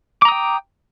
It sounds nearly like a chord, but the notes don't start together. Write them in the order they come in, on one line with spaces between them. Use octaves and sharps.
D6 A#5 D#6 G5